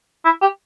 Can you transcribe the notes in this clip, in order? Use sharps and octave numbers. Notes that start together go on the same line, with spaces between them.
E4
G4